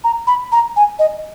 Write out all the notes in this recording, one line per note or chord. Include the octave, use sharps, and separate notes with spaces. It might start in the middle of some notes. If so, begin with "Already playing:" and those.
A#5
B5
A#5
G#5
D#5